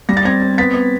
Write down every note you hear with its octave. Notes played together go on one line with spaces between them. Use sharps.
G3 A#6
A6
C4 G#6 A#6
C4
B3 A6 B6
B3